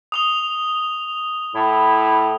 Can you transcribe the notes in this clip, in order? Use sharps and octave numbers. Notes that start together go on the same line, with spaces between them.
D#6 F7 G7
A2 E4